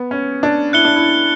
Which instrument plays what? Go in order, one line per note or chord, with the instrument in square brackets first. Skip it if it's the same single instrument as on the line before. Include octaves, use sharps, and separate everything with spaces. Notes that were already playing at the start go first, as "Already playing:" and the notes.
Already playing: [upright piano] B3
C#4
D4
[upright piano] E4 [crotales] F#6 C#7 G7
[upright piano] D4
E4